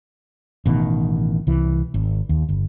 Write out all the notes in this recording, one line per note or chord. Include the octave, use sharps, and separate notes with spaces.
A1 B2 D3 D#3
C2 E3
G#1
D#2
G1